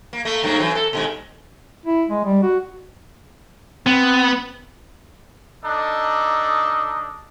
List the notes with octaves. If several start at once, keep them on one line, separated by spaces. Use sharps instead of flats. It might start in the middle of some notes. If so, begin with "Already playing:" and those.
A#3
A3 A#3
G2 F#3 A#3
E3 F#3 C4
A4
B2 D#3 G#3
E4
G#3
G3
F#4
B3 C4
D4 D#4 A4 D#5